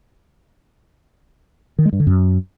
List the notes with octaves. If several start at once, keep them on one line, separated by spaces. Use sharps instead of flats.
D#3
G#3
G2
D3
F#2